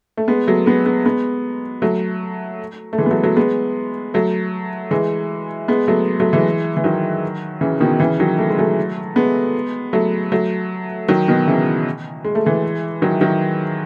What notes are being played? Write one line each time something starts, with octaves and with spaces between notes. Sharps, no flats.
A3
G#3 B3
F#3 A3
G#3 B3
G#3 B3
G#3 B3
F#3 A3
A3
E3 G#3
B3
F#3 A3
F#3 A3
G#3 B3
F#3 A3
E3 G#3
G#3 B3
F#3 A3
F#3 A3
E3 G#3
E3
D#3 F#3
C#3 E3
B2 D#3
C#3 E3
D#3 F#3
A3
G#3
F#3 A3
G#3 B3
F#3 A3
F#3 A3
D#3 F#3
B2 D#3
C#3 E3
G#3
A3
E3 G#3
D#3 F#3
D#3 F#3